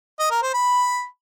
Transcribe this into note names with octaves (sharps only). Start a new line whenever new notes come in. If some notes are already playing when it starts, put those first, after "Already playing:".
D#5
A#4
C5
B5